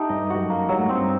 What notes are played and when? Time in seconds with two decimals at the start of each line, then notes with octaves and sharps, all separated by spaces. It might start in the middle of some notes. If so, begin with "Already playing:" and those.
Already playing: A3 D#4 G4
0.09 G2 D#5
0.30 F#4
0.35 G2
0.40 F#2
0.50 A#3
0.69 G2 F#3
0.79 A2
0.89 G2 C4